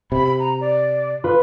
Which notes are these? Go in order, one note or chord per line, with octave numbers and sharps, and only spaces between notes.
C3 B5
A#5
D5
F4 B4